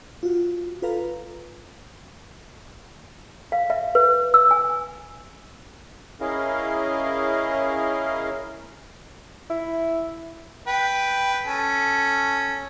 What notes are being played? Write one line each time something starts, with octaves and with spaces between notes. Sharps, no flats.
F4 F#4
F4 A4 B4 F5 A#5
F5
E5
B4
E6
G#5
C#4 E4 G#4 A#4 D#5 F5
E4
B4 G5
C#4 A4